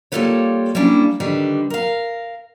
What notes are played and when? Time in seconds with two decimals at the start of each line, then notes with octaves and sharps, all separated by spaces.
0.12 G3 A#3 F4 A4 B4 C#5
0.75 G3 A#3 C#4 D4 E4
1.20 D3 D#3 G3 B4
1.70 A#4 F5